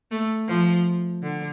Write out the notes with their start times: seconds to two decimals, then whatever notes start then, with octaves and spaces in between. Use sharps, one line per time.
0.11 A3
0.48 F3
1.23 D3